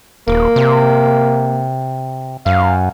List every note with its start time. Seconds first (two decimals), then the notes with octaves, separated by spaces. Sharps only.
0.28 D#1 A#3
0.56 C3
2.46 F#2 F5